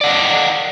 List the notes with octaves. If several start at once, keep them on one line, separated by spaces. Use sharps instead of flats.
D5 D#5 F#5